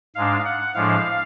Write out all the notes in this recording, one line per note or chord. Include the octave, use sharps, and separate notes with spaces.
G#2 G#3 D4 F5
F#5
A2 F3 G#3 D4 F5